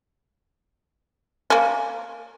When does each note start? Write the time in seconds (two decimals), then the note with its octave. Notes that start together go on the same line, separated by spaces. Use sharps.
1.50 A#3 C#4